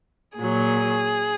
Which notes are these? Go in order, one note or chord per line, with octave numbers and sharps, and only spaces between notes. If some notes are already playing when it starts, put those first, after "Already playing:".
A#2 F#3 G#4